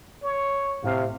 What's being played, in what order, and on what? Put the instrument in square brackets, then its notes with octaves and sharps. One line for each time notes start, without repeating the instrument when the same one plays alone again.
[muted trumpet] C#5
[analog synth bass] A2 [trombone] C3 [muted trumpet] F5